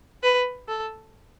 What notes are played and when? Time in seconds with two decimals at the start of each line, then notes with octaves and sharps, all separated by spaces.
0.23 B4
0.68 A4